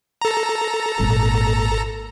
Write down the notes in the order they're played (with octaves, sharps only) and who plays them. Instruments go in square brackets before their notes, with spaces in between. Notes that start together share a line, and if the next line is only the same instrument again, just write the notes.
[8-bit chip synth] A4 A#5
[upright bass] G#1 A#2